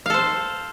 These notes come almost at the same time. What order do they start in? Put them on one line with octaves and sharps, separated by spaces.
F5 A4 C5